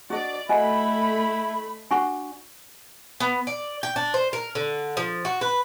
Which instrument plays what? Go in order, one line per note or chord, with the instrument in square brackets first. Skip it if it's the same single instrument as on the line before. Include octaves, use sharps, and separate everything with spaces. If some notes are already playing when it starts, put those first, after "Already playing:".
[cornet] D4 [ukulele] F#4 D#5 [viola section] D5
[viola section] A3 B5 [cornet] E4 [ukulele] F#4 [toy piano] D#5 G#5
[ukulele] D4 F#4 [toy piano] G#5 C#6
[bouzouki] B3
D5
G5
D4
C5
A#4
D3
F3
F#4
B4